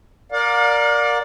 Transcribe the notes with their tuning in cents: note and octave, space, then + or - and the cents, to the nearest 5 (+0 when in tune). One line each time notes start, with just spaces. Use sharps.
A#4 +0 D5 +0 F5 +40